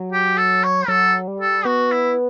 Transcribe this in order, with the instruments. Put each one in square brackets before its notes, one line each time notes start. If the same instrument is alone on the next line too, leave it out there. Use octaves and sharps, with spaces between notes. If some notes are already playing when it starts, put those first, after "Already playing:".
Already playing: [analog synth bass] F#3
[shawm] G4
A4
C#5
[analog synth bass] F#3 [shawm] A4
[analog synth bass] G3
[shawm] A4
[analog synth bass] B3 [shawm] F#4
[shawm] E4